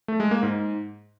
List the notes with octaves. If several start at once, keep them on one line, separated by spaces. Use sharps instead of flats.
A3
G#3
A#3
G#2